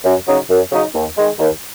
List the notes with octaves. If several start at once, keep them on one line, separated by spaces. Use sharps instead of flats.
F#2
C#3 F#3 D#4
F#2
C#3 F#3 D#4
D#2
D#3 G#3
D#2